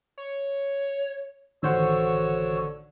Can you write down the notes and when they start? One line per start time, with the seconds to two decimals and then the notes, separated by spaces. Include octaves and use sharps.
0.18 C#5
1.63 A1 D3 D#3 F#4 C5 C#5 F#5 E6